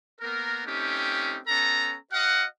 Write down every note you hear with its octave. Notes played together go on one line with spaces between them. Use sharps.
A#3 B3 A#4
A3 C4 C#4 D#4 G4
B3 C#4 A4 A#5
F#4 D#5 F5 F#5